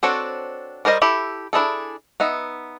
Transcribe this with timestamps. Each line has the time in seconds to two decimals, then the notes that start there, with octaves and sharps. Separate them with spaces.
0.03 C4 D4 F#4 A4 C#5
0.85 G3 A#4 C5 D#5
1.02 E4 G4 A4
1.53 D4 E4 G#4 A4
2.20 B3 D#4 E5